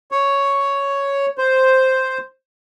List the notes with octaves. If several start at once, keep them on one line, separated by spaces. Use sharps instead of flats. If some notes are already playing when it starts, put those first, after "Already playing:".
C#5
C5